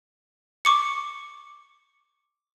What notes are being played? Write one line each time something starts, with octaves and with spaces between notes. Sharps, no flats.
C#6 D6 C#7